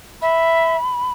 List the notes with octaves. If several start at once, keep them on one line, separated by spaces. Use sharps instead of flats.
E5 B5